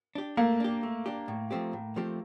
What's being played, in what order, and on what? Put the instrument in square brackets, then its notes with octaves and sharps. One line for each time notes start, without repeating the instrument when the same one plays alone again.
[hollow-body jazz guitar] D4 G4
[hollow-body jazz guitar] A3 [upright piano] A#3
[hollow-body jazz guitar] D4 G4
A3
D4 G4
A2
F3 A3 C4 G4
A2
F3 A3 C4 G4